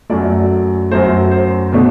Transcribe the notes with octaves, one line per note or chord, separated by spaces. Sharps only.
F#2 F#3 A3 D5
F#2 F#3 A3 C5
C5
B2 A3 D4